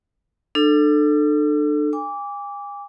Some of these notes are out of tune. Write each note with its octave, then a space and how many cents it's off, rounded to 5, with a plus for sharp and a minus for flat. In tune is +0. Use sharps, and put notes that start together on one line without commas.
D4 +35 A4 +0 E6 +40
G#5 -40 D6 -20